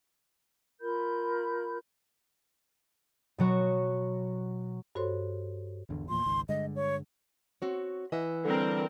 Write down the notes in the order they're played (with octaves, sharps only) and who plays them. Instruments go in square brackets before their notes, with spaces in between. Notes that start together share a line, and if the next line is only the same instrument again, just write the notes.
[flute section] F4 A#4 B5 G6
[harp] B2 F#3 F#4 C#6
[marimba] G2 F#4 A4 C5 C#5 C6
[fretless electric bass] G#1 E2 D3
[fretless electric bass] E2 A#2 F3 [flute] C6
[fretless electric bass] G#1 C#2 D#3
[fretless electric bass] G2 D3 G#3 [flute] D#5
[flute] C#5
[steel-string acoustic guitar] C4 F#4 C#5
[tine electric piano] E3 [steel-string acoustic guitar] D#5 E5 F#5
[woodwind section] D3 G3 [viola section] C4 A#4